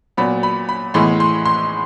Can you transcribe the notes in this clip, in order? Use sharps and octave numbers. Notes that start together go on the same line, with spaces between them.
A#2 F#3 B3 B5
B5
B5
A2 E3 G#3 B3 C6
C6
C6